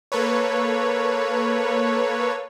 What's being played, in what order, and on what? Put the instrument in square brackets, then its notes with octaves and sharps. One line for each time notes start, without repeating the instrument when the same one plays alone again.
[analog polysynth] A#3 A4 B4 C#5